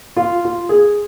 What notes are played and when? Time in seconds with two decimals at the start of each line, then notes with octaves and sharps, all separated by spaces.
0.16 F4
0.45 F4
0.69 G#4